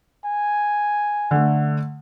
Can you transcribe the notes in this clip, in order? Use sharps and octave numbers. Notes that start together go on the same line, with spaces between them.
G#5
D3 A3